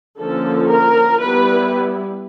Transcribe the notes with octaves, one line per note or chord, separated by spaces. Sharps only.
D3 F3 A#3 C#4 A4
A#4
G3 B3 E4 B4